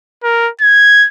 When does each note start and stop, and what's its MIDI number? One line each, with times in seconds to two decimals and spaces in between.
0.23 0.49 70
0.61 1.08 92